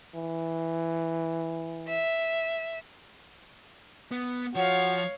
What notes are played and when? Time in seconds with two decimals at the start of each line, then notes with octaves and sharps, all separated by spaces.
0.15 E3
1.88 E5
4.11 B3
4.55 F3 F#4 C#5 F5